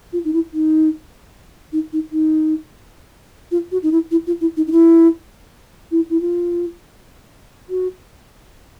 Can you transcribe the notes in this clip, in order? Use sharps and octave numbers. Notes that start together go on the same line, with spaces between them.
F4
D#4
E4
D#4
D#4
D#4
D#4
F4
F#4
D#4
E4
E4
F4
E4
D#4
D#4
E4
E4
E4
F4
F#4